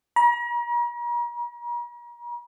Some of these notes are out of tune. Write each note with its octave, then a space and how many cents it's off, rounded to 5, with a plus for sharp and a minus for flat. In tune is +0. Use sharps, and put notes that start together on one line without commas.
A#5 +40